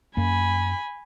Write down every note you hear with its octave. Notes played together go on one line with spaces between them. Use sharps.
F#2 A#3 G#5 B5